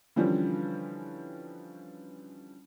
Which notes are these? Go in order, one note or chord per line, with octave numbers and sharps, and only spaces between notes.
D3 E3 F3 G3 C#4